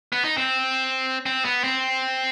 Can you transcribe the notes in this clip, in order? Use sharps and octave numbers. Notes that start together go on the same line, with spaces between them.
B3
D#4
C4
C4
B3
C4